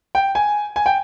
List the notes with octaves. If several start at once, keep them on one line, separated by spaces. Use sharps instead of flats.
G5
G#5
G#5
G5